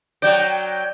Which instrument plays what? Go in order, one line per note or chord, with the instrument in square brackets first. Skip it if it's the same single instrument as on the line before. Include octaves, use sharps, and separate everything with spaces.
[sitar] F#3 D5 [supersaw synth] G5